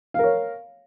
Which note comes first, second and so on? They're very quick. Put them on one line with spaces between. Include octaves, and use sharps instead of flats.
F5 A#4 C#5